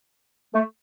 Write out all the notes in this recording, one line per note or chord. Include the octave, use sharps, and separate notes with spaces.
A3